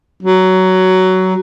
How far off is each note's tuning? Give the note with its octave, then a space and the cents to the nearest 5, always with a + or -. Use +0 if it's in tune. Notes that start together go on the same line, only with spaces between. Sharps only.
F#3 +15